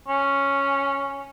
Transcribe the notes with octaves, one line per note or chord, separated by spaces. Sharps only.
C#4